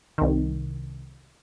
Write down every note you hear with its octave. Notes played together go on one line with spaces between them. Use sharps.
C2 D#3